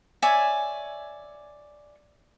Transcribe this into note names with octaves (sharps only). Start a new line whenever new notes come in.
C#5 D5 E5 G#5